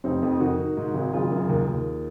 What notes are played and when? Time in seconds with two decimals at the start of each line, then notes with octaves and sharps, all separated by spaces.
0.04 F1 C4 D#4
0.23 F2
0.40 D#3 D#4 F#4
0.59 D#3
0.77 G#2
0.94 G#1
1.13 F#1 F4 G#4
1.32 F#2
1.49 D#2
1.67 D#2